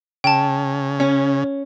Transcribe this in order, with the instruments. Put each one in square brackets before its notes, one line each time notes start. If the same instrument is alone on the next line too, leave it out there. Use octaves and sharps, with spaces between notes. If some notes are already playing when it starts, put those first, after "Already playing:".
[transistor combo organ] C#3 [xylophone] G5 A5
[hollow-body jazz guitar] C#4